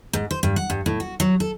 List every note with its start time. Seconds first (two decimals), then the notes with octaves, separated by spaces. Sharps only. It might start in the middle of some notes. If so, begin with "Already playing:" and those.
0.13 G#2
0.31 C5
0.43 G2
0.56 F#5
0.70 G2
0.86 A2
1.00 F#4
1.20 F#3
1.40 A4